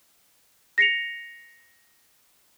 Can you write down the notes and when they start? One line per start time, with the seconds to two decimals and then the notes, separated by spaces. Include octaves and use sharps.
0.78 A#6 C7 C#7 F7